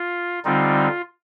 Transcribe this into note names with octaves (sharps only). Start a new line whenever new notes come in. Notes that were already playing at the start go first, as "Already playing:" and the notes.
Already playing: F4
D3 G3 C4 D#4 F4